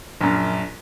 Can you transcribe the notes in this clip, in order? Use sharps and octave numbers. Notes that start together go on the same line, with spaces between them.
A#1 F#2